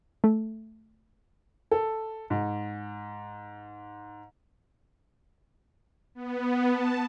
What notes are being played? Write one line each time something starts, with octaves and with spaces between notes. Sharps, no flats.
A3
A4
G#2
B3
A5